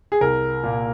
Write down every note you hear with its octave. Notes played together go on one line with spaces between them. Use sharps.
G#4
C2 A#4
A#2 A#3